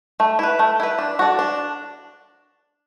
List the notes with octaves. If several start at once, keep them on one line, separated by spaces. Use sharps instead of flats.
A3
E4 B4
A3
E4 B4
D4
F#4 A4 D5
D4